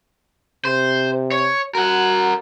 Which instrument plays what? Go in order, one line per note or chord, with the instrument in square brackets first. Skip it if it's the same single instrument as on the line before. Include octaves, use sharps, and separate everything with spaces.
[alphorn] C3 [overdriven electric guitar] C5
[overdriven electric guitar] C#5
[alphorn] F#4 [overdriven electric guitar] A#4 F#5